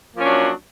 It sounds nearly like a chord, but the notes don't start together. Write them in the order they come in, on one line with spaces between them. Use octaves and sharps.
A#3 F3 C#4 F#3 D4